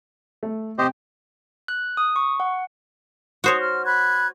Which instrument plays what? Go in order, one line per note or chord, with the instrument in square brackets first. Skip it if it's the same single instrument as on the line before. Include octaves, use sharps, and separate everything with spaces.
[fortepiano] A3
[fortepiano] C3 G5 [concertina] G4 C5 D#5
[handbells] F#6
D#6
C#6
F#5
[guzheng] F#4 C5 C#5 [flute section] D#6
[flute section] F6
B5 F#6 G#6